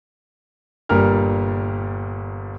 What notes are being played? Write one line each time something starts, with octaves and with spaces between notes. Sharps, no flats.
G1 G2 A#2 G3 A#4 F6